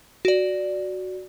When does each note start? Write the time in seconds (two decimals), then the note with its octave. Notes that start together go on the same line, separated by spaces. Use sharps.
0.25 F#4 D5